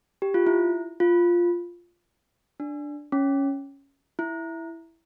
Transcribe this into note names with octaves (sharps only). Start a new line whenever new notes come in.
G4
F4
E4
F4
D4
C#4
E4